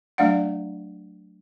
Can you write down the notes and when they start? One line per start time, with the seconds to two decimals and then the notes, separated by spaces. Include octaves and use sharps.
0.18 F#3 A3 D4 D5 F5 F#5